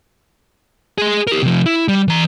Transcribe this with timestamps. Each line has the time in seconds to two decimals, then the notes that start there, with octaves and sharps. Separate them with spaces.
0.98 G#4 C6
1.27 G4 A#4
1.42 C3 F3
1.66 E4
1.88 G3
2.08 E3 A#5